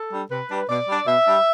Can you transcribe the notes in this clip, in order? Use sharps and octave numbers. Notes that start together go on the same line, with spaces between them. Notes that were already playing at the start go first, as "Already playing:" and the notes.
Already playing: A4
G3 D4
C3 B4
G3 D4
B2 D5
G3 D4
B2 E5
G3 D4